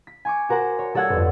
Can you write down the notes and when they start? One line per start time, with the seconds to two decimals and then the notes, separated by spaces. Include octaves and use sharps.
0.07 B6
0.25 G#5 C#6 D6
0.49 F#4 A#4 C5 F#5
0.79 C#5
0.94 G3 A4 C#5 F#5 E6 G#6
1.09 G1 F2